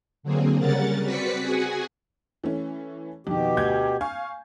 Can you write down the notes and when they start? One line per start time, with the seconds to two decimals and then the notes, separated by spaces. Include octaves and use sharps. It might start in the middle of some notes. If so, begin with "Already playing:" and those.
0.23 D3 F#3 A#3 C4 G#4
0.59 C#3 G3 C#4 A#4 F#5 A6
1.03 C4 F#4 B4 D5 B6 C#7
1.42 F#4 G#4 F#5 G#5
2.44 E3 A3 C#4
3.27 F2 B2 D#3 G4
3.57 D2 G6 G#6
4.01 F5 G#5 C#6